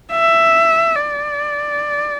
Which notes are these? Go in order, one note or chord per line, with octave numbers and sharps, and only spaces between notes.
E5
D5